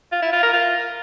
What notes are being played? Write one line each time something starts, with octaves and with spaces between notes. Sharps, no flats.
F4
E4
F4
A#4
F4